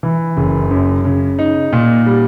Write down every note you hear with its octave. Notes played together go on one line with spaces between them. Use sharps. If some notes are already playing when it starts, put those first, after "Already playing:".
E3
F#1
F#2
C#3
D#4
A#2
G3